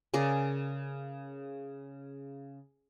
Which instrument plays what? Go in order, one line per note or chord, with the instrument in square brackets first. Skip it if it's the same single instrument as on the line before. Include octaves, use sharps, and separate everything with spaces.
[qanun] C#3 G#4 A#4 D5